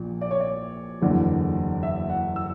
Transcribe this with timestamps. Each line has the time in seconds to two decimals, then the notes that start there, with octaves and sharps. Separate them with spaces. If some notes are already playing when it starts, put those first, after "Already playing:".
Already playing: A#1 A#2
0.21 D5
0.31 C#5
0.40 D5
1.02 F#1 E2 D3
1.83 E5
2.09 F#5
2.36 E6